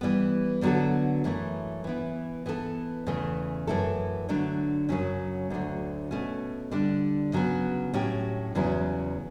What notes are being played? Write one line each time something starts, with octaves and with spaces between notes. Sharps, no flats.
E3 G3 B3
D3 F#3 B3 F#4 A4
F#2 E3 A3 E4
E3 B3 E4
E3 B3 F#4 A4
E2 C#3 E3 A3
F#2 E3 A3 E4 A4
D3 F#3 A3 D4
F#2 C#3 F#3 C#4
D2 D3 F#3 A3
B2 A3 C#4
D3 G3 D4
C#3 F#3 B3
A2 F#3 C#4 G4
E2 C#3 F#3 C#4 E4